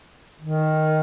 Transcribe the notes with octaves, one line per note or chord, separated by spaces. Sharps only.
D#3